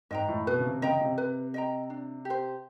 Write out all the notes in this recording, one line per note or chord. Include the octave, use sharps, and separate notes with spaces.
G#2 D#5 G5 A#5
A2
B2 B4
C#3
C3
C#3 D#5 G5 A#5
C3
B4
D#5 G5 A#5
D4
G4
C5